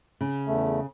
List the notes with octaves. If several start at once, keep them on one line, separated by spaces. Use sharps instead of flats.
C#3
E2 A3